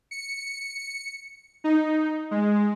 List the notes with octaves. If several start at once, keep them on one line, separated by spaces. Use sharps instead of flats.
C#7
D#4
G#3